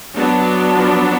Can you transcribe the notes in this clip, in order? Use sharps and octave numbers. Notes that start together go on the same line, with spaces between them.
F#3 B3 D4
F3 F4